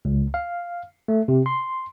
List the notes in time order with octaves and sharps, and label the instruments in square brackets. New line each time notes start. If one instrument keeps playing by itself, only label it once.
[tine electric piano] C#2
F5
A3
C3
C6